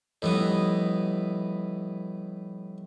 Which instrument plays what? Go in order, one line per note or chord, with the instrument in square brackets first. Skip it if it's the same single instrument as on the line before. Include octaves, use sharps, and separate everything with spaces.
[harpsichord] A2 E3 B3 [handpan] F3 G3 D#5